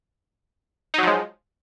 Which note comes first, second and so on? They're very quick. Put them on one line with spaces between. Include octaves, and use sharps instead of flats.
D#4 F#3 F3 G#3